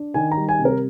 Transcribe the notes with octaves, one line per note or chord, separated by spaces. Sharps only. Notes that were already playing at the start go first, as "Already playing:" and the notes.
Already playing: D4
D#3 G#5
A#5
G3
G#5
C3
A#4